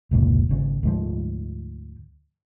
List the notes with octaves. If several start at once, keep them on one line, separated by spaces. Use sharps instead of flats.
F1 C#2 A#2
G#1 C#3
D2 G#2 F3